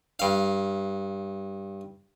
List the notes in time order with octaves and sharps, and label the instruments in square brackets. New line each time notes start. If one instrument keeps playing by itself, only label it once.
[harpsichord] G2 F5